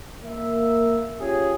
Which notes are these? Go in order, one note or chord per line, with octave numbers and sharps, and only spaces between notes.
A#3 E5
C#4 F4 G4 G#4